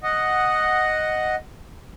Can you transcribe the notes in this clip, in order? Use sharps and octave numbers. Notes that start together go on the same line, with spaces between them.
D#5 F#5